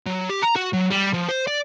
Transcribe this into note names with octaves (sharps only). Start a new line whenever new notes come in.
F#3
G4
A#5
F#4
F#3
G3
F3
C5
D5